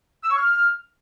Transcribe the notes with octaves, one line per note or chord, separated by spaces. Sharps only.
E6
C#6
F6